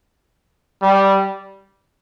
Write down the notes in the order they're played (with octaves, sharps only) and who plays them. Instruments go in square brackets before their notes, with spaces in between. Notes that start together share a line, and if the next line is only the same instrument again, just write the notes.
[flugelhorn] G3